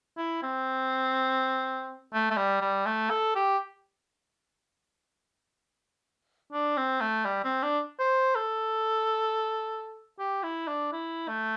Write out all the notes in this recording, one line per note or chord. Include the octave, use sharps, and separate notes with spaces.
E4
C4
A3
A3
G3
G3
A3
A4
G4
D4
C4
A3
G3
C4
D4
C5
A4
G4
E4
D4
E4
A3